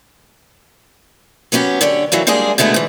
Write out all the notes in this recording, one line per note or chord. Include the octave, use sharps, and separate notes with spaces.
F#3 B3 C#4 F#4 G4
D3 D4 G4 C#5
E3 F#3 A3 A#3
G3 G#3 A#3 D4 G#4
B2 D3 G#3 A3 B3
G#2 E3